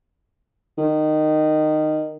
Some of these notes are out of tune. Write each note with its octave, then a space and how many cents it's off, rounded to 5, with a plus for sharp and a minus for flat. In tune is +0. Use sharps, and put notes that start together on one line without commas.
D#3 -15